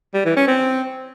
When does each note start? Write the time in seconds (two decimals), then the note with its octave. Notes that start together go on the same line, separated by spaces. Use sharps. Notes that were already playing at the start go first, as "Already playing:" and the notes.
0.14 G3
0.25 E3
0.37 C#4
0.48 C4